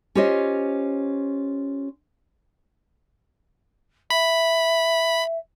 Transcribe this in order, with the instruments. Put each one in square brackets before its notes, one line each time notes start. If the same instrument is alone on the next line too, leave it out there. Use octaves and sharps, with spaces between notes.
[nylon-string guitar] C#4 F4 G4 C5 C#5 D#5
[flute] E5 [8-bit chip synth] B5